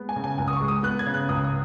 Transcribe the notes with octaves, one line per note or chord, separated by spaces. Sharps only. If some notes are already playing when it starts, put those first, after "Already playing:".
Already playing: G#3 B3
G#5
C#3
G#5
C#2 G#5
D#6
C#6
G#3
D#6
B3 F#6
G#6
C#3
F#6
C#2 D#6
D#6